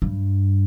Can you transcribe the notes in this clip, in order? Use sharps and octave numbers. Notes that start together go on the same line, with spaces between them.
G2